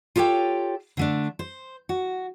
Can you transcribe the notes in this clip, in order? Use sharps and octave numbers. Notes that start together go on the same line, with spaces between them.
F4 G4 A4 C#5 G5
D3 A3 D4
C5
F#4